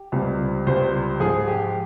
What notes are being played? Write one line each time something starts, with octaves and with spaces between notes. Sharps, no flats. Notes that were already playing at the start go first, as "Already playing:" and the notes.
Already playing: G4
C#2 C3 G3
C#2 C3 G3 C5
G#2 F3 G#4
G4